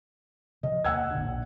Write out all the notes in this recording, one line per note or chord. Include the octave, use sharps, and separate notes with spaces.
C3 F3 D#5
D#2 A#3 F#5 E6 G#6
G#1 A#2 D3
A#1